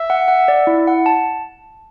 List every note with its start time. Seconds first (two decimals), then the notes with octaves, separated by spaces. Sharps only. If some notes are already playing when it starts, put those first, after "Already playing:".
Already playing: E5
0.10 F#5
0.28 F#5
0.48 D5
0.67 E4
0.87 F#5
1.06 A5